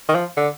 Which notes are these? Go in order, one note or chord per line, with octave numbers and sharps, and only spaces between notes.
D#3
F3
D3